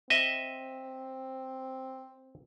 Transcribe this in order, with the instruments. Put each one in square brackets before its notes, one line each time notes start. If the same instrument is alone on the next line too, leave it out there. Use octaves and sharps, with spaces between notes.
[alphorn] C4 [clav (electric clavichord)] D#5 E5